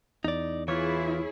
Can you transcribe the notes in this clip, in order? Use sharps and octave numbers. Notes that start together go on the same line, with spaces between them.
E2 D#4 D5
E3 E4 F4 G#4 C#5